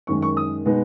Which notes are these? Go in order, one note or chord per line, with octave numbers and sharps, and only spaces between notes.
F#2 D#3 G#3 C#6
C#6
D#6
B2 G#3 B3 D#4